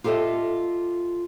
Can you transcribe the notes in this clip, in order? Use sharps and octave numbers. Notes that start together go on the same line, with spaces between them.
F4 G4 A4 C5 D#5 E5